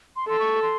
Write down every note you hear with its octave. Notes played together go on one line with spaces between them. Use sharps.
C6
A4 C6
C#6
C6